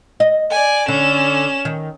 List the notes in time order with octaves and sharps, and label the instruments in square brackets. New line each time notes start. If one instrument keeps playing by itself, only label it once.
[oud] D#5
[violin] D5 G#5
[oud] D3 [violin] C#4 E7
[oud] D#3